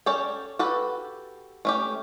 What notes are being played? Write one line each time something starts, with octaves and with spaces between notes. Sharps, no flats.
C#4 A4 C#5 D5 G5
F#4 G4 A4 B4
A3 C#4 G4